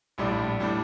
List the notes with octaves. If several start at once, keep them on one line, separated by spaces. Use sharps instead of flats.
A#1 A2 G3 D4
A2 G3 D4